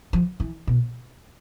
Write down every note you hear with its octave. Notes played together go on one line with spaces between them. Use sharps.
F3
E3
B2